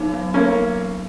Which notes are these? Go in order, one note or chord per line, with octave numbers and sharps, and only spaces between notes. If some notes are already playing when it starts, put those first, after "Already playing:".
Already playing: F#3 B3 D#4
F#3
A#3 B3 C#4